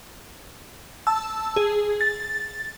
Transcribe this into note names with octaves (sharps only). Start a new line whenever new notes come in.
A5 E6
G#4
A6